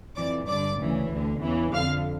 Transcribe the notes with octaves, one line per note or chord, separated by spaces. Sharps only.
F2 E3 D5 D6
G2 D3 D5 D6
D2 C#3 E3
D2 D3
E2 C#3 E3
F2 D3 F5 F6